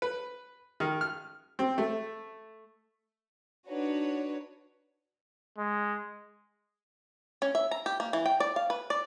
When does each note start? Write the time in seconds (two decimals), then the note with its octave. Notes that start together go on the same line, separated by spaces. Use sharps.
0.02 B4
0.80 D#3
1.01 F6
1.59 C4
1.78 A3
3.69 D4 D#4 F#4 B4 C#5
5.59 G#3
7.42 C#4
7.55 E5
7.71 A#5
7.86 G4
8.00 A#3
8.13 E3
8.26 G5
8.40 D5
8.56 F5
8.70 B4
8.90 D5